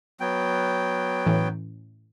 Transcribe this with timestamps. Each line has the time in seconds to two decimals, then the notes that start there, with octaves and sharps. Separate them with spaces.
0.20 F#3 B3 G5
1.26 A2 E3 C#4